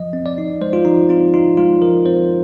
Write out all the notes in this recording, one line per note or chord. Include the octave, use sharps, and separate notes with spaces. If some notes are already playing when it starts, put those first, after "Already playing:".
Already playing: F3 D#5
C4
D5
D#4
G#3 C5
F4
F3 D#4
C4 F4
D#4 F4
G#3 F4
F3 A#4
C4 C5